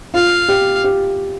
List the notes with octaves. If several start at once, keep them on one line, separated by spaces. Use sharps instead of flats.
F4 F5
G4
G4